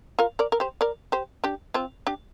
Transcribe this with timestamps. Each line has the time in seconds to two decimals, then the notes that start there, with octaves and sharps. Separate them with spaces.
0.19 F4 A#4
0.39 A#4 D5
0.52 A#4
0.60 G4 C5
0.81 A#4 D5
1.12 G4 C5
1.44 D4 G4
1.74 C4 F4
2.07 D4 G4